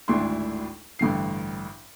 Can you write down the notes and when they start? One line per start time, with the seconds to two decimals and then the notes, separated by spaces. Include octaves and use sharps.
0.08 G#1 D2 A2 D4 E4 C6
0.99 A1 G2 D3 C7